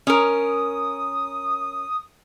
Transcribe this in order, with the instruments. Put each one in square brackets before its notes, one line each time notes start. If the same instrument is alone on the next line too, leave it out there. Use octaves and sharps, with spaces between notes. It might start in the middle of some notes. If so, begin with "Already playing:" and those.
[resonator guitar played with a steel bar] C#4 A#4 [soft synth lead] D#6